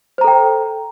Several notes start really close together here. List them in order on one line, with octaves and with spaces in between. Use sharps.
C5 A#5 A4 G5